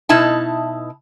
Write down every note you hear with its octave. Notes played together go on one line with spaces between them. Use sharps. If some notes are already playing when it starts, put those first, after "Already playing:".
B2 D#4 E4 A5